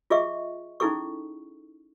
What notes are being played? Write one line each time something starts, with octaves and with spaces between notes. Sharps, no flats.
F4 G#4 D#5 E5 C#6
C#4 D#4 E4 G#4 A4 C#6